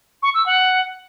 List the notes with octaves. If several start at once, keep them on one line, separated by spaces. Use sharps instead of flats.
C#6
E6
F#5